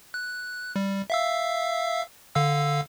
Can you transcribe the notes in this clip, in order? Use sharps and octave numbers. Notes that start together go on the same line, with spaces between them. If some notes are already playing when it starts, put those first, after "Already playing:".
F#6
G3
E5 F5 E6
D3 F5 E6